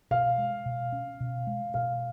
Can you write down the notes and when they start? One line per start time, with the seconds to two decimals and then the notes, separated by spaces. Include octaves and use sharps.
0.11 B2 F5
0.38 G#3
0.66 B2
0.92 C#4
1.20 B2
1.47 G#3
1.74 B2 F5